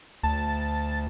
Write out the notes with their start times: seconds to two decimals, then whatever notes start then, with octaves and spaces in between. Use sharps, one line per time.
0.23 D2 A5